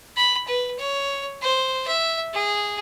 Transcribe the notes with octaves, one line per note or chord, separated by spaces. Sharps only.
B5
B4
C#5
C5
E5
G#4